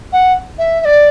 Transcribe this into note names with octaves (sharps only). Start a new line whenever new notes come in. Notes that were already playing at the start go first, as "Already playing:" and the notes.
F#5
E5
E5
D5